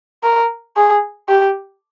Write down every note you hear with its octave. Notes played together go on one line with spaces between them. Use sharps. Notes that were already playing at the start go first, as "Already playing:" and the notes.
A#4
G#4
G4